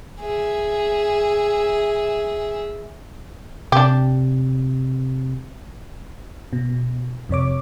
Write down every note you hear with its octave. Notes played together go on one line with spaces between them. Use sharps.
G#4 E5
C3 D4 G4
B2
F2 C3 C#5 D6